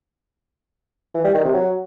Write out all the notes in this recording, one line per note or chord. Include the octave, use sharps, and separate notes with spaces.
E3
G3
D#3
C3
F#3